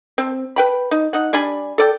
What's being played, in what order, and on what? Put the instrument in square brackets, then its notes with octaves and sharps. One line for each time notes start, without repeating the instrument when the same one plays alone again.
[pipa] C4
B4 G5 B5
D#4
D#4 F#5
G3 D4 G#5 B5
A4 D5 G5